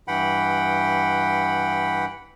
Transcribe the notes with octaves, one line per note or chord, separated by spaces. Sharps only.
G2 E3 F#5 G5 B5